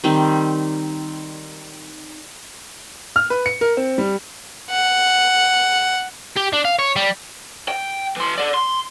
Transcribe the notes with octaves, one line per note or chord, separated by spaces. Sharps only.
D#3 G3 C4 D#4
F6
B4
C#7
A#4
C4
G3
F#5
G4
D4
F5
C#5
G3
G5
E3 C6
D5 F#5
C6